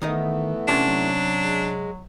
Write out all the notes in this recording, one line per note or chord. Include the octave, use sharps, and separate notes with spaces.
D#3 E3 A3 B3 D#4 D#5
C3 C#4 D4 A5
F#3
G#3